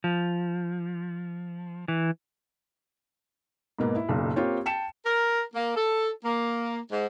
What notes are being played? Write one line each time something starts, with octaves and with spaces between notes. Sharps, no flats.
F3
E3
G#2 B2 A#3 B3
E4
F#1 B1 A#2
A#3 C4 F4 G4 C#5
G5 A5 C#7 E7
A#4
A#3
A4
A#3
G#2